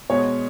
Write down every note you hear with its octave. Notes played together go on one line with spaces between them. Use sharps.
B2 G#3 B3 C#5